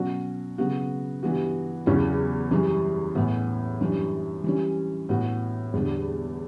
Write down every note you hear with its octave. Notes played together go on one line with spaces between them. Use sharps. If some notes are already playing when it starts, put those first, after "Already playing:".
Already playing: B2 F#3 C#4 F#4
C#3 F#3 B3 F#4
G2 E3 B3 F#4
E2 C#3 F#3 C#4 E4
F#2 E3 G3
A2 E3 B3
F#2 E3 G3 D4
E3 G3 C#4
A2 E3 B3 F#4
E2 D3 G3 D4